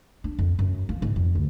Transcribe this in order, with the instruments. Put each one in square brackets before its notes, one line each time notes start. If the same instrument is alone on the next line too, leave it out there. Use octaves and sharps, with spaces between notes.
[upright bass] D4
F2
F#2
F3
G#2
F2
D2